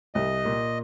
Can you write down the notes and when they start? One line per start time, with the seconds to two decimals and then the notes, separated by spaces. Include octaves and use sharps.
0.15 C2 D#5
0.45 A#2